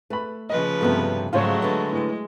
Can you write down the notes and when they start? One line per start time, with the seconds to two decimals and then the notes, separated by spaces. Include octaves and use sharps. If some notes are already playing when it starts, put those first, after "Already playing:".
0.10 A3 B4 B5
0.50 C#3 F3 B4 D#5
0.81 G2 C3 F#3 A3 B3
1.33 G#2 C#3 F#3 G#3 A3 F4 C5 C#5
1.62 D3 B4
1.93 A2 G#3